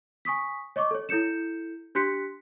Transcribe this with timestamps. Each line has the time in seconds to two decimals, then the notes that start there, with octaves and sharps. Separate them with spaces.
0.25 G#5 C#6 D#6 B6
0.76 C#5 D#5 C#6 D6
0.91 A4 C#5
1.09 E4 A4 G6 C#7 E7
1.95 D4 G4 C6 F#6 B6 C#7